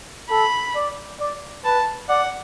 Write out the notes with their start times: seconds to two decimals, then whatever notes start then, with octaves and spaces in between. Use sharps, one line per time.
0.31 A4 B5
0.75 D5
1.20 D5
1.65 B4 A5
2.09 D5 F#5